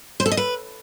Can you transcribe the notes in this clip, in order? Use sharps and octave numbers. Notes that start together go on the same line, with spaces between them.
C5
A4
D#5
B4